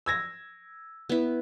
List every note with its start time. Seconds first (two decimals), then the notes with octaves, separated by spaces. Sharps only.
0.06 E6 G#6 A#6
1.09 B3 E4